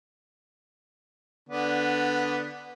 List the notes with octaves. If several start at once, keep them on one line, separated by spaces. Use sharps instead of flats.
D3 B3 D4